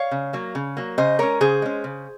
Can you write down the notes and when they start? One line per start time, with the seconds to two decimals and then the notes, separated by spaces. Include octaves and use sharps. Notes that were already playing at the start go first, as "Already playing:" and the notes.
Already playing: C#5 F5
0.11 C#3
0.33 F#3 A#3
0.55 C#3
0.77 F#3 A#3
0.98 C#3 C5 D#5
1.19 G#3 C#4 A#4 C#5
1.41 C#3 G#4 C5
1.62 G#3 C#4
1.84 C#3